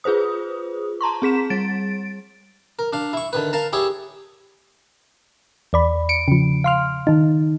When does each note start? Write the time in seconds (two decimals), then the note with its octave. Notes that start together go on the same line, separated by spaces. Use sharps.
0.04 F4 G#4 B4 C5 D#6
1.01 A5 A#5 C6 C#6
1.22 C4 G#4 B6 E7
1.50 G3 A6 D7
2.79 A#4
2.93 D4 F5
3.13 E4 C#6
3.33 D3 D#3 B4
3.53 A#4 F5 A5 A#5
3.73 E4 G4 G#4 C#5 E5
5.73 E2 D5 B5
6.09 C#7 D7
6.28 C#3 F3
6.64 F5 C6 F6
7.07 D#3 D#4